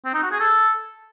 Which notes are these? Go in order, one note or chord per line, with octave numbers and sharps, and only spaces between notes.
C4
D#4
F#4
G#4
A4